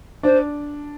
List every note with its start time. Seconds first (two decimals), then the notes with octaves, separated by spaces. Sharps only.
0.23 D4 C5